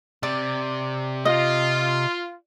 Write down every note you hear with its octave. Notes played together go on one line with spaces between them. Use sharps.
C3 D5
F4 D#5